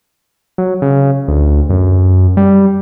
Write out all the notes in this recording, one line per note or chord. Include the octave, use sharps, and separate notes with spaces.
F#3
C#3
D2
F#2
G3